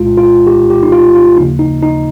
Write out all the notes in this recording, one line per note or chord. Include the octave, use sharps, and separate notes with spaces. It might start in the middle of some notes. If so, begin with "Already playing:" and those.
Already playing: C2 A#2 G#3 F4
F4
G4
G4
D#4
F4
F4
D#2 C#3 F3 A#3 D#4
D#4
D#4